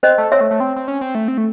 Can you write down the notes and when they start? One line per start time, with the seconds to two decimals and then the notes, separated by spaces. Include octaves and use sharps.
0.03 C4 C5 D#5
0.18 A3
0.32 C4 C#5 E5
0.41 A3
0.51 A3
0.60 C4
0.76 C4
0.88 C#4
1.01 C4
1.15 A3
1.28 C4
1.38 A3